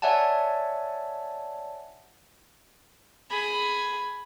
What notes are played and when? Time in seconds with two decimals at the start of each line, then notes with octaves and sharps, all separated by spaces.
0.02 C#5 D5 E5 F#5 G#5 A5
3.30 G#4 B5